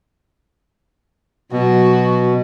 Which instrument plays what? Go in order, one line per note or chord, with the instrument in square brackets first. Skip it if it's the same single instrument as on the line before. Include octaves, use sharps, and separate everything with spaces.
[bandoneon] B2 [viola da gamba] F#3 F#4